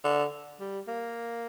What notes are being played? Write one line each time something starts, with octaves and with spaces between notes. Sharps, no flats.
D3
G3
A#3